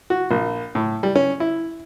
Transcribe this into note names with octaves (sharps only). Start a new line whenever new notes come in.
F#4
A#1
A2
G3
C#4
E4